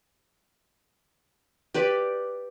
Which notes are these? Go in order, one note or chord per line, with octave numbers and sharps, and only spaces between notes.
G4 B4 D5